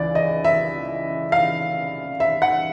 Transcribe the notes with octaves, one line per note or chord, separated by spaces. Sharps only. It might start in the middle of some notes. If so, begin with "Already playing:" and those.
Already playing: C#2 C#3 E3 D5
D#5
E5
F5
E5
F#5